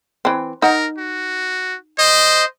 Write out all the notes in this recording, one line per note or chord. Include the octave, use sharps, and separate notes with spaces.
E3 C4
D#4 A#4 F#5
F#4
C5 D#5